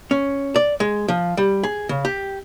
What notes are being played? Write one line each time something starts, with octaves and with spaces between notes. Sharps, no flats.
C#4
D5
G#3
F3
G3
G#4
C#3
G4